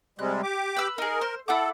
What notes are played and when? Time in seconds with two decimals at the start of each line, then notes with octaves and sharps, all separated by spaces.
0.19 C3 G3 G#3 F#6
0.43 G4 D6
0.76 B4 E6
0.98 D#4 G#4 A#4
1.21 C5
1.48 E4 A4 F#5 D6